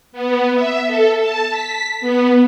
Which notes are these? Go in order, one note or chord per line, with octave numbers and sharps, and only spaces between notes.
B3
E5
A4
A5
B6
B3